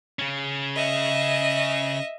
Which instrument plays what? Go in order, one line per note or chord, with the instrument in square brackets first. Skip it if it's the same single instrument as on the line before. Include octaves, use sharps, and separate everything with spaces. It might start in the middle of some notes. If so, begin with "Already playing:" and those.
[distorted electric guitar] C#3 C#4
[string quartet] D#5 E5